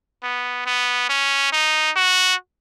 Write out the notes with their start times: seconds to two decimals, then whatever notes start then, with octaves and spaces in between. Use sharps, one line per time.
0.23 B3
0.66 B3
1.09 C#4
1.52 D#4
1.96 F#4